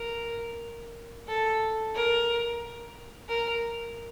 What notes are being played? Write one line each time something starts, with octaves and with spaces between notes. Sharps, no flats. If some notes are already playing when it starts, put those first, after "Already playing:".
Already playing: A#4
A4
A#4
A#4